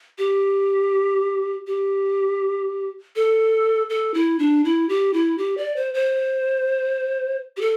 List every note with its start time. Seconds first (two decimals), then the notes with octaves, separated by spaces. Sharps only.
0.18 G4
1.67 G4
3.16 A4
3.90 A4
4.14 E4
4.39 D4
4.65 E4
4.89 G4
5.14 E4
5.38 G4
5.58 D5
5.76 C5
5.94 C5
7.57 G4
7.61 A4